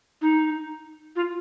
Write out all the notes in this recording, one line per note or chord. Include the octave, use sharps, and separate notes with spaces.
D#4
F4